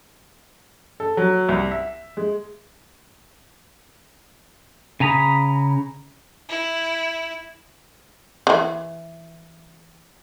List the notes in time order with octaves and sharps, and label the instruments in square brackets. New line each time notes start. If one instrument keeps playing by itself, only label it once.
[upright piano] A4
F#3
C2
E5
G#3
[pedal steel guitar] C#3 G#5 A#5 B5 D#6
[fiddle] E4
[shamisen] C#3 E3